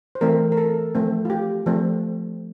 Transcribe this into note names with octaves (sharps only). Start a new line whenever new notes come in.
C5
E3 A3 C4 A#4
A#4
A4
F3 A3 C4
F4
G4
F3 A3 C4